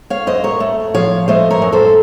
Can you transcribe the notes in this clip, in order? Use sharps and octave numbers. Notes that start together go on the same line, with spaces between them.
C#5 F5
F#2 C5 D#5
A#4 C#5
A3
F3 C#5 F5
A3 C5 D#5
A#4 C#5
F#2
A4 C5